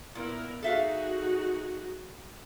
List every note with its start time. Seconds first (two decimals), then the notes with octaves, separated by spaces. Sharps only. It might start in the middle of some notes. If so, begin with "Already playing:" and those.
0.15 A#2 B3 E4 A#4
0.63 D#4 F#4 G#4 A4 E5 F5